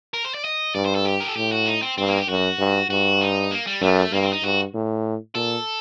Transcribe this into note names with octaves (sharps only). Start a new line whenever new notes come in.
A#4
C5
D5
D#5
G2 D5
C5
A4
G4
A#4
A4
A2 G4
F#4
D#4
C4
G2 C4
A#3
G4
F#2 F#4
G2
G2 F#4
D#4
A#3
G3
F#2 A3
G2 A#3
C4
D#4
G2 F#4
A2
A#2 A4